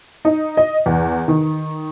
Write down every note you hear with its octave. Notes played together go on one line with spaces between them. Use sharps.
D#4
D#5
E2
D#3